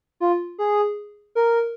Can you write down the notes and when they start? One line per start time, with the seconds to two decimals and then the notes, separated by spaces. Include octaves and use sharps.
0.20 F4
0.58 G#4
1.35 A#4